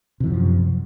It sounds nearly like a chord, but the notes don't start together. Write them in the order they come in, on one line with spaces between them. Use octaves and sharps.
C3 E3 F#2 F3